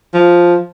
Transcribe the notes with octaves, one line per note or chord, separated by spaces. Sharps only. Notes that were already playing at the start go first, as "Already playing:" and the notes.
F3